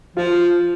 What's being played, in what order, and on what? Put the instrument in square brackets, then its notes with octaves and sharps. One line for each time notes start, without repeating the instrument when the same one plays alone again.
[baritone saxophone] F3 [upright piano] F4